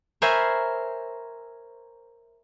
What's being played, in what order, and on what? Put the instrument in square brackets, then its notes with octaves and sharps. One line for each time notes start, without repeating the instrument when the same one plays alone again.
[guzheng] A#4 C5 C#5 E5 G#5 B5